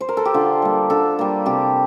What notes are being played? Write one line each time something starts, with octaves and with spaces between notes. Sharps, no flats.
C5
A#4
A4
G4
D3 F4
G3 A#3
D3 A4
G3 A#3
C3 G4